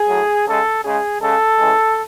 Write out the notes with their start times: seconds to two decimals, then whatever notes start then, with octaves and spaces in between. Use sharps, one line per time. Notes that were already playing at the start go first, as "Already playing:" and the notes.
Already playing: G#4
0.08 A2 F#3
0.46 C#3 G#3 A4
0.84 C#3 G#3 G#4
1.21 C#3 G#3 A4
1.59 C#3 E3 G#3